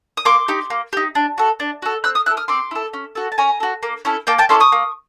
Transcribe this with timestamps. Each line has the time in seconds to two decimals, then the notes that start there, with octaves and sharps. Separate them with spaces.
0.17 D#6
0.25 A#3 C6 D6
0.48 D#4 G4
0.70 A#3
0.93 D#4 G4
1.15 D4
1.38 F#4 A4
1.60 D4
1.82 F#4 A4
2.04 C4 E6 F#6
2.15 D#6 F6
2.26 E4 E6 F#6
2.30 A4
2.37 D#6 F6
2.48 C4 C6 D6
2.71 E4 A4
2.93 C#4
3.15 F#4 A4
3.32 A5
3.38 C#4 G#5 A#5
3.60 F#4 A4
3.83 A#3
4.05 C#4 E4 A4
4.27 A#3 G5 A5
4.38 G5 A5
4.49 C#4 E4 A4 C6 D6
4.60 C#6 D#6
4.72 A#3